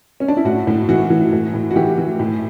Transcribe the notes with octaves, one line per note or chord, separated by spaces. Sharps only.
C#4
D4
E4
A2 F#4
A2
E3 F#4
E3
A2
A2
F#4
E3 G4
E3
A2